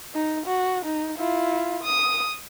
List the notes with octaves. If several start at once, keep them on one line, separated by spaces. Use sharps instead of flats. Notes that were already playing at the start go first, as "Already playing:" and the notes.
D#4
F#4
D#4
E4 F4
D#6